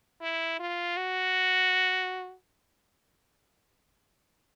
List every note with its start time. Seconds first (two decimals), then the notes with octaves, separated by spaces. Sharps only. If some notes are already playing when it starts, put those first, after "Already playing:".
0.21 E4
0.59 F4
0.97 F#4